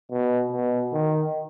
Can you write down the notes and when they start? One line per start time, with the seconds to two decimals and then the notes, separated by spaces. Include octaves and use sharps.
0.11 B2
0.52 B2
0.93 D#3